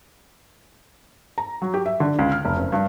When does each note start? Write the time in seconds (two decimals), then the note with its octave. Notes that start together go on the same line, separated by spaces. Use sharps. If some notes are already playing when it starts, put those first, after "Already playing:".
1.38 A#5
1.62 F#3
1.74 G4
1.86 E5
2.00 D3
2.19 C#2
2.32 F6
2.45 F1
2.57 F#1
2.72 G2